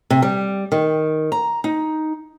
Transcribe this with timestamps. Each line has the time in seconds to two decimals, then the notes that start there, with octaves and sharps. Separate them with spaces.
0.10 C3
0.22 G3
0.72 D#3
1.32 A#5
1.64 D#4